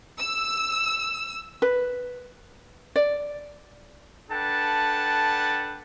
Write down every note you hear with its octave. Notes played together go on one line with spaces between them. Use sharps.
E6
B4
D5
D4 A4 B4 F#5 G5 A5